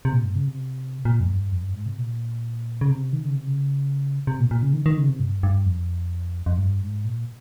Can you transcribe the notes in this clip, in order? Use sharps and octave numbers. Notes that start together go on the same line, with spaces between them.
C3
A#2
G2
C#3
C3
A#2
F2
G2
F2
G2
G#2
C3
A#2
C#3
C3
D#3
C#3
C3
C#3
C3
A#2
A#2
C#3
D#3
D#3
C#3
C3
G2
G2
F2
F2
G2
G#2
A#2